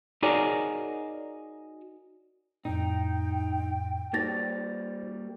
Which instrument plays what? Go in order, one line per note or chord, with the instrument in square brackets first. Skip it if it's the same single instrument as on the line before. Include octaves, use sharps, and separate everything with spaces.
[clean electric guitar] D#4 F#4 G#4 A#4 C#5 D5
[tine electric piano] F2 A2 [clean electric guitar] D#4 [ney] G5
[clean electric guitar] G3 A#3 [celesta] D#4 A6 A#6 [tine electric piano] F#4 C5